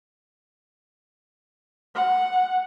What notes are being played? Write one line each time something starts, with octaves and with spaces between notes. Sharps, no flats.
F#5